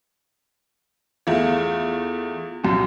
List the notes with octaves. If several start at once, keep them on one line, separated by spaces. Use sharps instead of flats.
E2 A3 F4 G#4 F5
C2 F#2 A#2